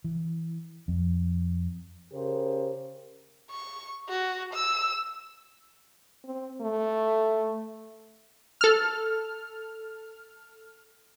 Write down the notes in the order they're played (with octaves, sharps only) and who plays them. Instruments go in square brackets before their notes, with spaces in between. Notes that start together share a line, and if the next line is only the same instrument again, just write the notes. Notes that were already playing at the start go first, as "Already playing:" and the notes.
[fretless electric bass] E3
F2
[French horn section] C#3 G4 A#4 C5
[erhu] C#6
F#4
E6
[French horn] C4
A3
[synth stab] A4 F6